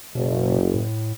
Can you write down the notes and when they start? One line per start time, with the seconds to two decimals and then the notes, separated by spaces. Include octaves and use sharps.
0.15 F#1 B2
0.74 A2